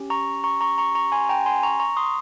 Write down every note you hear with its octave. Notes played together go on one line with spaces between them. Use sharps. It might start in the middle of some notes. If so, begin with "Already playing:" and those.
Already playing: C#4 G4
A#5 C#6
A#5 C#6
A#5 C#6
A#5 C#6
A#5 C#6
G#5 C6
G5 A#5
G#5 C6
A#5 C#6
A#5 C#6
C6 D#6